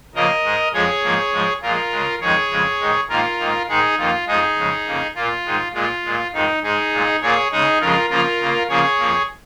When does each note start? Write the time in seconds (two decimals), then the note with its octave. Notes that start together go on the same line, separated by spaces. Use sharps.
0.15 C#3 F3 A#3 A#4 D#5
0.44 G#2 G#3
0.73 F2 F3 G#3 G#4 C#5
1.03 G#2 F3 A#3
1.32 G#2 F3 G#3
1.62 A#2 F3 G#3 F4 A#4
1.92 C#3 G#3
2.21 F2 D#3 G#3 G#4 C#5
2.51 F2 C#3 G#3
2.80 G#2 D#3 G#3
3.09 G#2 D#3 A#3 F4 A#4
3.39 G#2 D#3 A#3
3.68 G#2 D#3 G#3 D#4 G#4
3.98 F2 D#3 A#3 F4
4.27 F2 F3 G#3 D#4 G#4
4.57 F2 C#3 G#3
4.86 F2 C#3 A#3
5.15 A#2 A#3 F4
5.45 G#2 D#3 G#3
5.74 A#2 G#3 F4
6.04 A#2 G#3
6.33 F2 D#3 G#3 D#4
6.63 G#2 G#3 D#4 G#4
6.93 A#2 G#3
7.21 A#2 A#3 G#4 C#5
7.51 C#3 G#3 D#4 G#4
7.81 F2 C#3 F3 G#3 F4 A#4
8.10 C#3 F3 A#3 F4 A#4
8.40 C#3 A#3
8.69 C#3 F3 A#3 G#4 C#5
8.99 F2 F3 A#3